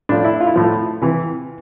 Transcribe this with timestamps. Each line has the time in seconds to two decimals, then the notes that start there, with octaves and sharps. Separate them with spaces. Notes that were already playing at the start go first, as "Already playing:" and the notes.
0.09 A2 F3 D4
0.24 E4
0.41 F4
0.47 E4
0.54 A2 F3 F4
1.01 C3 E3